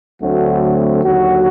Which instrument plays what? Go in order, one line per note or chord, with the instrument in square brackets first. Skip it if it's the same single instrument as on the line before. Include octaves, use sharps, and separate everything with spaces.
[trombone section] D2 D3 F#3 A3 C4 F#4
D#2 D3 F#3 F#4